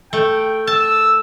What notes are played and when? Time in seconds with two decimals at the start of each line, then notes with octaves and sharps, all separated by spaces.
0.13 A3 G5
0.67 A5 E6